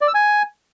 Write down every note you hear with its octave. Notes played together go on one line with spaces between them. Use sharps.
D5
E6
G#5